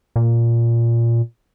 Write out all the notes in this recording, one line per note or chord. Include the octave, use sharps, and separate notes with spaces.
A#2